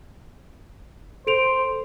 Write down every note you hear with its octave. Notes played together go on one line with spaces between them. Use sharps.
A4 C5 D7 F7